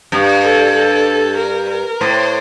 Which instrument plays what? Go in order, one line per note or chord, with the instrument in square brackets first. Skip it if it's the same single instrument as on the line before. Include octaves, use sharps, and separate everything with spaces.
[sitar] G2
[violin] A4
A4
A#4
A#4
[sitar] A2 [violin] C5